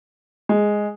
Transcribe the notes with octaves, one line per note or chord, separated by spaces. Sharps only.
G#3